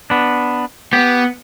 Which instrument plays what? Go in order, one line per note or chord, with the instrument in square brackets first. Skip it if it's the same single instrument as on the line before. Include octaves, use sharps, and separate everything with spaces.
[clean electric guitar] B3 D4
[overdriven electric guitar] B3 [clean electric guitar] G4